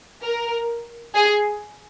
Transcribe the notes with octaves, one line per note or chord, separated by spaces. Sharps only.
A#4
G#4